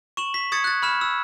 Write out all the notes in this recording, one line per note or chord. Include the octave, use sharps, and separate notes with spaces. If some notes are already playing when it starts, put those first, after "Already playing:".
C#6 E7 F#7
B6
C#6 D#6 G#6 A6 C#7
F#6 A6
B5 F6 E7
E6